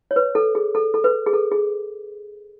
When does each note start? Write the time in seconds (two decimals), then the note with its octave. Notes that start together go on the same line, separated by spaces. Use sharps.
0.11 C#5
0.16 B4
0.35 A4
0.55 G#4
0.75 A4
0.94 A4
1.04 B4
1.27 G#4
1.33 A4
1.52 G#4